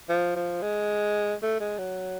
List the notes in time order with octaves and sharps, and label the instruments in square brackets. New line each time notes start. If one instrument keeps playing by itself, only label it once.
[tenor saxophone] F3
F3
G#3
A3
G#3
F#3